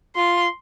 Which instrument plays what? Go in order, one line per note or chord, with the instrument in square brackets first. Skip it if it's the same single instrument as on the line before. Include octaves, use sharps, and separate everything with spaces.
[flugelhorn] F4 [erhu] C6